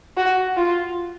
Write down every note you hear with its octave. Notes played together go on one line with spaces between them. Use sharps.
F#4
F4